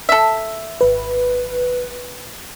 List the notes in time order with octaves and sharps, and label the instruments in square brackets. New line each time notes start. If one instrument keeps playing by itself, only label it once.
[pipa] A4 E5
[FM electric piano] G#1 B4